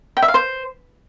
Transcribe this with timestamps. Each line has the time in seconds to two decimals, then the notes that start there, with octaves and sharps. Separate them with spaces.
0.17 G5
0.22 E5
0.28 F5
0.34 C5